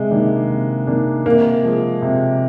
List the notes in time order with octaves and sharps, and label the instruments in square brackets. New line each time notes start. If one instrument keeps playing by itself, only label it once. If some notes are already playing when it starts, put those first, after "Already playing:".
Already playing: [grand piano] C3 [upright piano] G#3
[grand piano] D#3 A#3 D4
C3
D#3 A#3 D4
[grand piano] C3 [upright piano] A#3
[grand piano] F3 G#3
C3